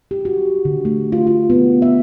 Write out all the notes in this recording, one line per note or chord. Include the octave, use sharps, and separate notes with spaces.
G4
F#4
D3
A3
F4
F4
B3
E5